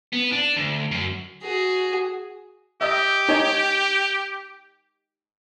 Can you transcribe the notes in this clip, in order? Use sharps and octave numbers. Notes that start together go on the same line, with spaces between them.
B3
D4
D2
F#2
F#4 G#4
G4 D#5 E5
D#4 C#5 G#5